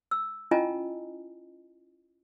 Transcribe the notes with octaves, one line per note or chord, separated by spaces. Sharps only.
E6
C#4 E4 F4 D#5 G#5 A#5